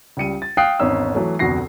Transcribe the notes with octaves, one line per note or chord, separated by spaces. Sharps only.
C#2 G3 C#7 D#7
A6
F5 G5 D#6 F#6 C7
G#1 E2 C#4 D#4 E6
E3 F#3 A3
F1 D2 B2 F#4 A#6 C7